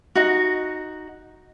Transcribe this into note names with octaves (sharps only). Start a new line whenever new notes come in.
D#4 F#4